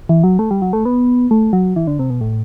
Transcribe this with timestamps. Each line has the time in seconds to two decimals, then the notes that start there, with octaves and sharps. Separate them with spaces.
0.09 E3
0.24 F#3
0.39 A3
0.51 G3
0.62 F#3
0.73 A3
0.85 B3
1.31 A3
1.53 F#3
1.76 E3
1.87 D3
1.99 C3
2.10 B2
2.21 A2